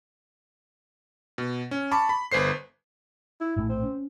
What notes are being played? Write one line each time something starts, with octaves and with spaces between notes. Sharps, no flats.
B2
C#4
A5 B5 C#6 D6
B5
G1 B4 C5 C7
E4
A#1 A2 A3 E4
C4
C#4